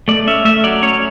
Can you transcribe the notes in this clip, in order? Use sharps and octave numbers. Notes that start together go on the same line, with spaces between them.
A3 D5
C#4 E5
A3 E5
F#3 D5
C#4 C#5